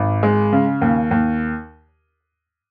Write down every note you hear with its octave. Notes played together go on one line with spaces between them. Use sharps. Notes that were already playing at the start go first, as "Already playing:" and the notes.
Already playing: G#1
G#3
C#3
D#2
D#2